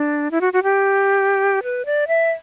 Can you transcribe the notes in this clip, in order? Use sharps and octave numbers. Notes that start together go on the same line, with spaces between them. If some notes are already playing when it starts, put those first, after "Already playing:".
Already playing: D4
E4
F#4
F#4
G4
B4
D5
E5